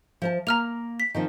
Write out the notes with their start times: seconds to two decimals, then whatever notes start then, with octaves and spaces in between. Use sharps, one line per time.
0.22 F3 C5 A5
0.47 A#3 A#5 F6 F7
1.00 B6
1.14 D#3 F3 C4